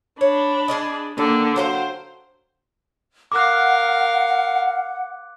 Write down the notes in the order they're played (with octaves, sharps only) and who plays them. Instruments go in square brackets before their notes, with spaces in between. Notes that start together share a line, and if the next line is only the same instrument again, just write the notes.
[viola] D4 B5 [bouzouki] C#5
[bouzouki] G#4 D5 D#5
[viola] D3 A#3 [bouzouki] D#3
[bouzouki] F#3 F5 G5 [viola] C5
[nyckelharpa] A#4 F5 [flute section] F#5 [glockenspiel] D6 F#6